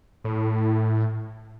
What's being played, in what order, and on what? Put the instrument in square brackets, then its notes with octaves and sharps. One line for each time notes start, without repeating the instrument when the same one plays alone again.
[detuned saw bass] A2